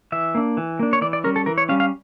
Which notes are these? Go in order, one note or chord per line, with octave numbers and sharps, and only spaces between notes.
E3 E5
A#3 D4
E3
A#3 D4
C#5
E3 D5
D5
G3 C#4 A#4
A4
E3 A#4
C#5
G3 C#4 F5
F5